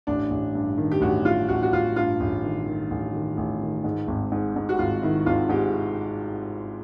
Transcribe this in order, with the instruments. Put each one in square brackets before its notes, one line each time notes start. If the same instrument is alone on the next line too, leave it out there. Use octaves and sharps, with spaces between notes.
[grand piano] A1 [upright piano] D4
[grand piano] A1
G2
D#3
[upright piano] G4
[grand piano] A1 [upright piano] F#4
[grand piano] A1 [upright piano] F4
[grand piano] A1 [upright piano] F#4
[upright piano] F#4
[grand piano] A1 [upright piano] F4
[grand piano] G2 [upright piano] F4
[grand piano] A1
D#3
D#3
A1
D#3
A1
D#3
G#2
G#1
G#2
G#2
[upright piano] F#4
[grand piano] G#1 [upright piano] F4
[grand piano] D#3 [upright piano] E4
[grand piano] G#1 [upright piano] F4
[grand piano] G#2 [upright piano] G4